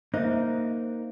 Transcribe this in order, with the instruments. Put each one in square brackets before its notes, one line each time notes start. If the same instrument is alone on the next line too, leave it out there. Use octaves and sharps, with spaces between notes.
[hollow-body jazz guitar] A#3 D#4 [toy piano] C5 E5